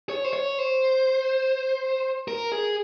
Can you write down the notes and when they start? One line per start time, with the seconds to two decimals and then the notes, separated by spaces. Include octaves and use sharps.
0.09 C#5
0.24 C5
0.33 C#5
0.58 C5
2.28 A#4
2.52 G#4